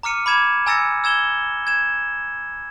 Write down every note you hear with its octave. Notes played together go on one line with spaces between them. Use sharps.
A#5 D6 F6 C#7 D#7
B5 D6 G#6 E7
G#5 A#5 E6 A6 A#6 C#7
E6 G#6 E7 G7
G#6 E7